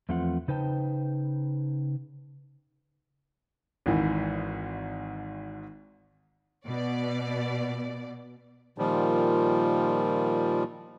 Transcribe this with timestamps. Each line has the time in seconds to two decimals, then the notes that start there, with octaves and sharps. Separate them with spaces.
0.09 E2 F3 A3 C4 F4 F#5
0.48 C#3 D#4 B4 C5 G5 A5
3.86 G#1 G#2 E3
6.66 B2 D5
8.78 A#2 D#3 F3 G3